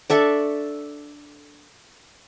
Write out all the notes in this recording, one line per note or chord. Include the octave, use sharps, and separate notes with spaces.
D4 A4 E5 C#6